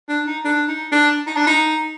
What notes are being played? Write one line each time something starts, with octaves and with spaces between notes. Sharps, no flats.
D4
D#4
D4
D#4
D4
D#4
D4
D#4